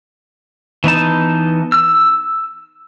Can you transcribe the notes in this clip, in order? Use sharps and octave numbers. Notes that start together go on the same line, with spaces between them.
E3 B3 D#4 A5
E6